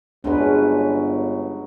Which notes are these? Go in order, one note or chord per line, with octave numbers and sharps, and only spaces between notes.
G1 C#3 F#3 G#3 C#4 D4 B4